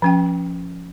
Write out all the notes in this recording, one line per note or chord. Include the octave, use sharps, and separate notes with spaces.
F3 C#4 G5